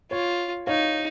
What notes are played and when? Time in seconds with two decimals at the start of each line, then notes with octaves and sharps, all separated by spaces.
0.11 F4 C#5
0.67 D#4 C#5 F5